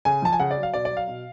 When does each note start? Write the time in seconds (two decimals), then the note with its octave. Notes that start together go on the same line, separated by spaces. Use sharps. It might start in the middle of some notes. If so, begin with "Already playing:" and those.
0.05 C#3 G#5
0.22 F3 A5
0.33 G#5
0.40 C#3 F#5
0.51 D5
0.57 F#3
0.63 F5
0.74 B2 D5
0.85 D5
0.90 F#3
0.97 F5
1.08 B2